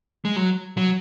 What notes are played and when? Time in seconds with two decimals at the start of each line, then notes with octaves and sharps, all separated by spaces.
0.25 G#3
0.36 F#3
0.77 F#3